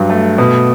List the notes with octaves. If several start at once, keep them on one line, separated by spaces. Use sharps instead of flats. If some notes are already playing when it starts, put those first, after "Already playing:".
Already playing: G2 F#3
A3
B2